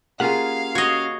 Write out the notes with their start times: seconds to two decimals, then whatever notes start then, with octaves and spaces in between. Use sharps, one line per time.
0.20 A#3 C#4 F4 G4 G#4 F5 F#5
0.75 F#4 C#5 D#5